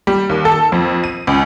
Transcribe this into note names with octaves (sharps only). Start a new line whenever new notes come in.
G3
D#2
A4
F2
D#7
C#2